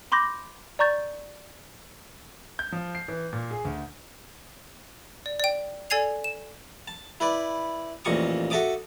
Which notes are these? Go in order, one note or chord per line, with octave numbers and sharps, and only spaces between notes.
B5 C6 D6 G6 A#6
D5 A#5 C#6 G6 A6
G6
F3
C7
E3
A#2
G#4
D2
D5
D5 G5
A4 D5 G#5 G#6 C7 F7
E7
A5
E4 B4 D5
A1 F2 A#2 A5 C#6 D#6
F#4 A4 E5 A5 D6 D#6